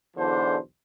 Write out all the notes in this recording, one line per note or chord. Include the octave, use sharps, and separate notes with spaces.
B1 E2 D3 E3 D4 C5